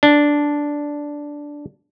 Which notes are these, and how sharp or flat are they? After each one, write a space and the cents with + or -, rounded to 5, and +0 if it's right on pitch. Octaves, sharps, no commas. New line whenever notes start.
D4 -5